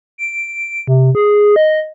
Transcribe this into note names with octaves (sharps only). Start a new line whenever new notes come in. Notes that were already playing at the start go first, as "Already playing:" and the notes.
D7
C3
G#4
D#5